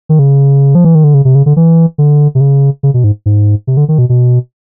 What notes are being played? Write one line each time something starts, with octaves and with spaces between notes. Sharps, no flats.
D#3
C#3
F3
E3
D#3
D3
C#3
C3
C#3
D3
E3
D3
C3
C#3
C#3
B2
G#2
G#2
C3
D3
D#3
B2
B2